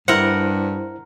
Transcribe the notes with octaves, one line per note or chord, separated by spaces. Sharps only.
G2 E4 A#4 C5 F#5